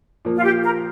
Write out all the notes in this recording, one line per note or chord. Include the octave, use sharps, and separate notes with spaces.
A#2 F3 A#3
F4
G4
A#4